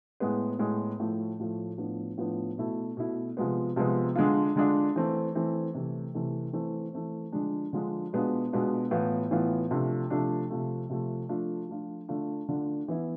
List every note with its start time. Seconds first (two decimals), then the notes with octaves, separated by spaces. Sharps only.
0.20 A2 G#3 B3
0.59 A2 G#3 B3
0.99 A2 F3 A3
1.39 A2 F3 A3
1.78 A2 F3 B3 D4
2.17 A2 F3 B3 D4
2.58 B2 A3 E4
2.97 B2 A3 E4
3.37 C3 F3 G#3 B3
3.76 C3 F3 G#3 B3
4.15 D3 G#3 D4 F4
4.56 D3 G#3 D4 F4
4.96 E3 A3 C4
5.35 E3 A3 C4
5.74 C3 E3 A3
6.15 C3 E3 A3
6.53 E3 A3 C4
6.93 E3 A3 C4
7.32 D3 F3 G#3 D4
7.73 D3 F3 G#3 D4
8.13 B2 G#3 B3 D4 F4
8.53 B2 G#3 B3 D4 F4
8.91 A2 E3 B3 F4
9.31 A2 E3 B3 F4
9.71 C3 F3 A3 D4
10.10 C3 F3 A3 D4
10.50 C3 F3 A3
10.90 C3 F3 A3
11.29 F3 A3 D4 F4
11.68 F3 A3 D4 F4
12.09 D3 A3 D4 F4
12.48 D3 A3 D4 F4
12.88 E3 B3 E4